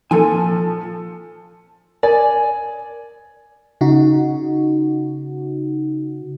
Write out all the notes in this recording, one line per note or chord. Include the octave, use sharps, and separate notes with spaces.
A#2 F3 A4 G#5
A#4 D5 G#5
C#3 D#4 F#4